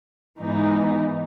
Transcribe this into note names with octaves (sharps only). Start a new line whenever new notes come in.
G#2 E3 B3 D#4